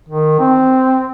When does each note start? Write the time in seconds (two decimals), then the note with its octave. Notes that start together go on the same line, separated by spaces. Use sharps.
0.09 D#3
0.40 C4